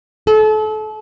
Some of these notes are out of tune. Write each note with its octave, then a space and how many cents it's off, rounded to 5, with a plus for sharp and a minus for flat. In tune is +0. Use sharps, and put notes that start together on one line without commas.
A4 -35